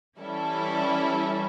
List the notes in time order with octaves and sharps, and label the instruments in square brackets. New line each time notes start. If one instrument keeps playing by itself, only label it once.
[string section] E3 G3 C#4 E4 A4